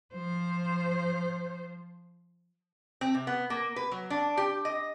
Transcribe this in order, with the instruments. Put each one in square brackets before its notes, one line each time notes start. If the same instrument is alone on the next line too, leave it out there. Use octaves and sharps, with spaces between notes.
[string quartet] F3 [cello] C5
[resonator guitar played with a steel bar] C4
C3
B3
A#3
B4
F#3
D4
G4
D#5